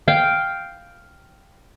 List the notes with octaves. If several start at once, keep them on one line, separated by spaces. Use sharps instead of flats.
F5 G5